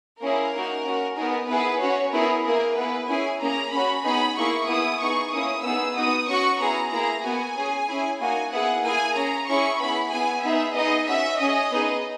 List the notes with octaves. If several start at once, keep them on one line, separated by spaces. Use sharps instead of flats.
A#3 C#4 E4 G#4 A#4
A#3 D#4 F#4
C#4 F#4
B3 D#4 G#4 A#4
B3 E4 G#4 B4
C#4 F#4 C#5
B3 E4 G#4 A#4
A#3 E4 G#4 A#4
B3 E4 G#4 B4
C#4 E4 G#4 G#5
A#3 C#4 G#4 A#5
C#4 F#4 B5
B3 D#4 G#4 B5
A#3 E4 G#4 C#6
B3 E4 G#4 D#6
B3 D#4 G#4 C#6
A#3 C#4 E4 D#6
B3 D#4 G#4 E6
B3 D#4 F#4 D#6
C#4 F#4 C#6
B3 E4 G#4 A#5
A#3 E4 G#4 A#5
B3 F#4 G#5
C#4 G#4
C#4 E4 G#4
A#3 D#4 F#4 G#5
B3 E4 G#4 F#5
A#3 E4 G#4 G#5
C#4 G#4 A#5
C#4 E4 G#4 C#6
B3 E4 G#4 B5
B3 E4 G#4 G#5
B3 D#4 G#4 E5
B3 D#4 G#4 D#5
C#4 F#4 E5
C#4 G#4 D#5
B3 D#4 G#4